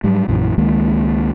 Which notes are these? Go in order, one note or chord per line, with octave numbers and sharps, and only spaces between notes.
G#2 F#3 G3
A#1 F#2 A#2 E3
C#2 D#3 G#3 A#3